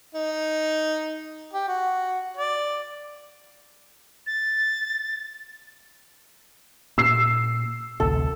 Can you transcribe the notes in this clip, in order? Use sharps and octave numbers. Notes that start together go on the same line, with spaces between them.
D#4
G4
F#4
D5
A6
A#2 E6 C7
A1 D2 C3 A4